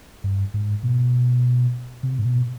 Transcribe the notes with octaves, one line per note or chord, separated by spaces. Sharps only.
G2
G#2
B2
C3
G#2
B2